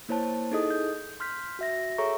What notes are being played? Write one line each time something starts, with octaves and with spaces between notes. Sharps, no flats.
A#3 E4 C5 C#5 A5
D#4 E4 G#4 A4 D#5 D#6
G6
C6 F6 G6 B6
F#4 E5 A#6
G#4 A4 C#5 E5 A#5 C#6